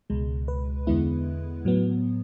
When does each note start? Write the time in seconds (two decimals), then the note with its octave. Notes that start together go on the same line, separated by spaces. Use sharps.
0.10 C#2 B2 G#3
0.48 B4
0.87 E2 D3 G#3 B3 E4
1.65 A2 F#3 B3